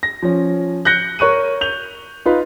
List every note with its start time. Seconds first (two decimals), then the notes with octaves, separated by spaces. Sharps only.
0.03 A#6
0.22 F3 C#4
0.85 F#6 G6 A#6 C#7 G7
1.19 A#4 C#5 C#6 F#6 D#7
1.61 G6 F7
2.26 D#4 F4 B4